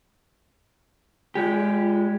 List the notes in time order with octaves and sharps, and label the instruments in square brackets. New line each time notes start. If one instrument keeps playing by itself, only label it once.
[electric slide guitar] G#3 G4 [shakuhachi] F4